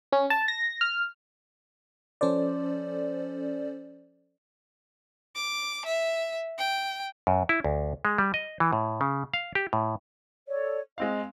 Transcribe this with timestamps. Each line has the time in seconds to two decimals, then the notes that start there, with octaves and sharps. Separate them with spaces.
0.12 C#4
0.30 A5
0.48 A#6
0.81 F6
2.21 F3 C#4 A4 C5 D5
5.35 D6
5.86 E5
6.58 G5
7.27 F#2
7.49 E4
7.64 D2
8.05 G#3
8.18 G3
8.34 D#5
8.60 E3
8.73 A2
9.01 C#3
9.34 F5
9.55 G4
9.73 A2
10.47 A4 C#5 D5
10.98 G#3 C4 D#5 F5